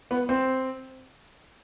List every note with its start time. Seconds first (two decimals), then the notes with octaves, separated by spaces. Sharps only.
0.11 B3
0.29 C4